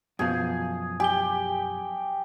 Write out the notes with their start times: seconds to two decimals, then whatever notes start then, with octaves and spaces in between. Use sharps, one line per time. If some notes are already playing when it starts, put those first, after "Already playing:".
0.19 F#2 B2 F3 G#4
1.00 G4 G#5 G7